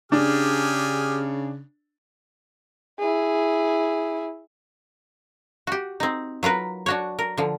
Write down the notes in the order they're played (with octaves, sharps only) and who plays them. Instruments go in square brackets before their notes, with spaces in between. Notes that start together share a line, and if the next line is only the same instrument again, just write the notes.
[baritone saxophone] C#3 [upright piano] D4 [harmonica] G4 G#4 F6
[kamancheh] E4 G#4
[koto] F#4 G4
C4 D#4
F#3 F4 A#4 B4
D4 F#4 C#5
A#4
D3 F3